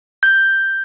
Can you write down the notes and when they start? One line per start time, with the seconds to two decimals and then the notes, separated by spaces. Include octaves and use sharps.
0.23 G6